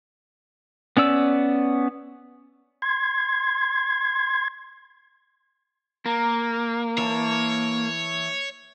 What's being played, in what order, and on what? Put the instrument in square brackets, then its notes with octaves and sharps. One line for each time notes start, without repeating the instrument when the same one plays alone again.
[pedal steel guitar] B3 C#4 D5 E6
[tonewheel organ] C6 G#6
[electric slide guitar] A#3 [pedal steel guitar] A#5
[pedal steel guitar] E3 A5 [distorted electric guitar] C#5